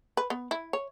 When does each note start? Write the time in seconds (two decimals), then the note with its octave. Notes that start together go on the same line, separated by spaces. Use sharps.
0.17 B4
0.30 B3
0.51 E4
0.73 C#5